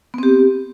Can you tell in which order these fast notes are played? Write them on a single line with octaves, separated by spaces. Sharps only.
B3 C4 G4